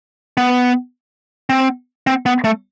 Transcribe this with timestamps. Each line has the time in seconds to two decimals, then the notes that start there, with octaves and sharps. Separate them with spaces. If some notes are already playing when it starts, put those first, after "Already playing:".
0.37 B3
1.50 C4
2.07 C4
2.26 B3
2.44 A3